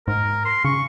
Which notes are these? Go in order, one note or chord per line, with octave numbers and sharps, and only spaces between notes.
G#2 A#4
C6
C#3 C#6